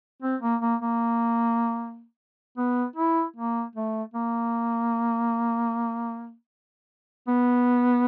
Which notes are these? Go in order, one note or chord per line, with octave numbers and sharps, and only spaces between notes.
C4
A#3
A#3
A#3
B3
E4
A#3
A3
A#3
B3